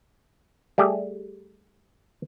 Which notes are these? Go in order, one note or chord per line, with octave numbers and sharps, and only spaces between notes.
G3 A3 G4 G#4